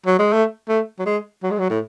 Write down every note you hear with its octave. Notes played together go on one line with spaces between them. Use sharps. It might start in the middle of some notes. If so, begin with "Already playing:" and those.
F#3
G#3
A3
A3
F#3
G#3
F#3
G#3
F#3
A2